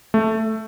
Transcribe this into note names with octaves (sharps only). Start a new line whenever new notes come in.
A3